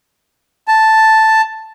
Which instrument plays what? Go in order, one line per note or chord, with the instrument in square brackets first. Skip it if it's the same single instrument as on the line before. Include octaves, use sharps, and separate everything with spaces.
[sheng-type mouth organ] A5